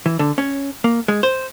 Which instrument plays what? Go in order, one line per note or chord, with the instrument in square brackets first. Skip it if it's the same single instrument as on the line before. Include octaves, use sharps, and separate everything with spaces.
[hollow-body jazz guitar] E3
D3
C#4
A#3
G#3
C5